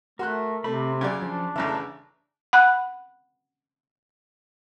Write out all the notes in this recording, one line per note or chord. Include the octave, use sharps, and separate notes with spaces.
A3 F#4 A#4 C6 F#6
C3 A3 C4 B5
C#3 F#3 D5 G#5
F3 C#4 D4
A1 C#3 E3 E5 A#5
F#5 B5 F#6